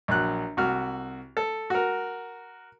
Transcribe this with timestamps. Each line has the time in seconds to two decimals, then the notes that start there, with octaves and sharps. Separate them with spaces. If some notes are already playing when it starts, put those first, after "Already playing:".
0.08 A#1 F#3 F#6
0.57 C2 F#4 F6
1.37 A4
1.70 F#4 A#4